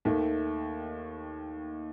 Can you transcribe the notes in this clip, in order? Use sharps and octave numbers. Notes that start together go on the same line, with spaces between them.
D#2 D#3 A3